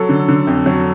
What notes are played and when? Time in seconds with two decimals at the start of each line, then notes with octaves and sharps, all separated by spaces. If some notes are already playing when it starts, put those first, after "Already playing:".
Already playing: F#3 A4
0.09 D3
0.28 D3
0.47 F2
0.66 F#3